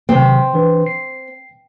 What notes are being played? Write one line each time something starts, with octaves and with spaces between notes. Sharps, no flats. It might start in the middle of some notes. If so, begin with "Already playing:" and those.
C3 D#3 F#3 C4
E3 D4 B4
C7